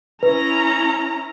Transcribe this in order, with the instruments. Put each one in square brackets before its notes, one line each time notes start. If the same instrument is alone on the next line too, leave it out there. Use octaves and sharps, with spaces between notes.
[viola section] C#4 E4 A#5 [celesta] B4